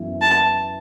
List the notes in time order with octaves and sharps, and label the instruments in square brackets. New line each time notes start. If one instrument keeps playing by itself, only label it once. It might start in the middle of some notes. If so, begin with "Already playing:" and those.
Already playing: [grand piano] F#2 E3 B3 E4
[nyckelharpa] A5